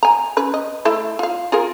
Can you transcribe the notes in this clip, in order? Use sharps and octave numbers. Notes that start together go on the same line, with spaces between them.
G#5 A#5
C#4 B4
D#5
A3 E4 E5
F4 F5
F4 G#4 A#4